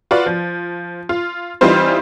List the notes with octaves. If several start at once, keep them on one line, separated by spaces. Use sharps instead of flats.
F4 F#4 B4 D5
F3
F4
E3 G3 C4 D#4 F4 C5